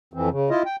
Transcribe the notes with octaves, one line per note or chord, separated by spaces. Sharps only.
F2 E3 C4
C#3
E4 F4 D#5
G5